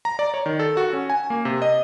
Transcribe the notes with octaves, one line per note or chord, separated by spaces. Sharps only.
A#5
D5
C#5
D#3
A4
F#4
C#4
G#5
A#3
C3
D#5